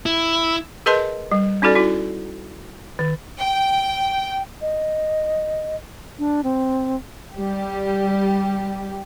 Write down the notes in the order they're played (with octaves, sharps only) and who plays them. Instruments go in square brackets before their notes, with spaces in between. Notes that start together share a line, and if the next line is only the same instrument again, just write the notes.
[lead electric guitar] E4
[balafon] G#4 A#4 B4 D#5 A5 C6
G3
C#4 D#4 F#4 A4 D5
E4 F#4
D#3
[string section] G5
[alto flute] D#5
D4
C4
[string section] G3 G4